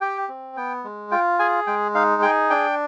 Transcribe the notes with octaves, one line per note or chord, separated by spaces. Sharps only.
G4 G5
C4
B3 G5
G#3
F4 G5
G#4 G#5
G#3 G5
D#4 F5
G#4 G5
D4 G5